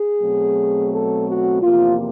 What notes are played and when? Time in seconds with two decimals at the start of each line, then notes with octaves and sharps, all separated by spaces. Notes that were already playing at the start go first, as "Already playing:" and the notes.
Already playing: G#4
0.21 B2 F#3 A3 C4
0.91 A4
1.27 F#4
1.62 E2 C3 F3 A#3 F4